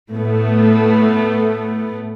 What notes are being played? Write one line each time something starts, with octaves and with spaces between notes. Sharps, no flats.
A2 A3 B3